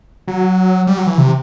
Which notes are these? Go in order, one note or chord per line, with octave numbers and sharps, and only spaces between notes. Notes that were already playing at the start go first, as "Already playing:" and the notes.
F#3
G3
F#3
E3
C3